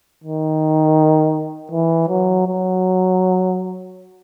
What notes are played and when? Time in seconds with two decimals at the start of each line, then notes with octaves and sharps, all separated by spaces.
0.24 D#3
1.72 E3
2.09 F#3
2.47 F#3